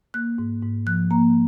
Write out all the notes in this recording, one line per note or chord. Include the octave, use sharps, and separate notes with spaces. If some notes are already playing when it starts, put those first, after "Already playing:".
A#3 F#6
G#2
G#2
F3 F#6
A#3 A#5